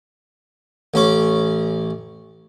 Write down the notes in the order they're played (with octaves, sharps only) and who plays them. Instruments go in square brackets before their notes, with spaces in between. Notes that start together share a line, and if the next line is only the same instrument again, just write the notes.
[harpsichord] A1 C#4 D6